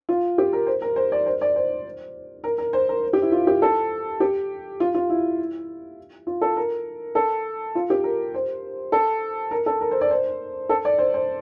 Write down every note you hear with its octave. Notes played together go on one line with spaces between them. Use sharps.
F4
G4
A#4
C5
A#4
C5
D5
C5
D5
C5
A#4
A#4
C5
A#4
G4
E4
F4
G4
A4
G4
F4
F4
E4
F4
A4
A#4
A4
F4
G4
A#4
C5
A4
A#4
A4
A#4
C5
D5
C5
A4
D5
C5
C5